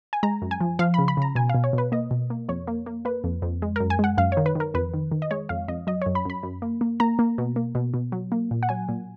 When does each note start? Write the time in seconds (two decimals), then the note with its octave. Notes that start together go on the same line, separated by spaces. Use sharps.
0.13 G#5
0.23 G#3 A#5
0.42 F#2
0.51 G#5
0.61 F3
0.79 F3 F5
0.94 C#3 B5
1.08 B5
1.17 C#3 A#5
1.35 B2 G#5
1.50 F5
1.55 B2
1.64 C#5
1.73 B2 B4
1.92 A#3 D#5
2.11 B2
2.30 A#3
2.49 F2 C#5
2.67 A#3
2.86 A#3
3.05 A#3 B4
3.24 F2
3.42 F2
3.62 G#3
3.76 F#2 A#4
3.90 G#5
3.99 G#3 F#5
4.18 F#2 F5
4.32 D#3 C#5
4.46 B4
4.55 D#3 A#4
4.74 F2 B4
4.94 D#3
5.12 D#3
5.22 D#5
5.31 G#3 C#5
5.49 F2 F5
5.68 F2 D#5
5.87 F#3 D#5
6.02 F#2 C#5
6.15 B5
6.25 F#2 B5
6.43 F#2
6.62 A#3
6.81 A#3
7.00 A#3 A#5
7.19 A#3
7.38 B2
7.56 A#3
7.75 B2
7.94 B2
8.12 F#3
8.32 A#3
8.51 A#2
8.63 F#5
8.69 F#3 G#5
8.89 A#2